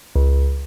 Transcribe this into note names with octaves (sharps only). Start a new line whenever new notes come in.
C#2